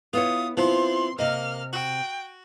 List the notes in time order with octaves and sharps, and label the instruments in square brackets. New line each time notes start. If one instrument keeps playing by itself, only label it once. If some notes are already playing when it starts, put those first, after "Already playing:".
[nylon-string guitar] B3 E4 C#5 [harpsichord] F4 [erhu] D#6
[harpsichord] F3 B3 E4 [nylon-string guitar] C4 [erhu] C6
[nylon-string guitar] C3 D#5 [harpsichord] A#3 [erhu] F6
[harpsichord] F#4 [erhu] G5